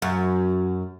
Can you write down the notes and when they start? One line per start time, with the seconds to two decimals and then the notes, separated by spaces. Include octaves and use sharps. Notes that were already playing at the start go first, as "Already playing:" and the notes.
0.02 F#2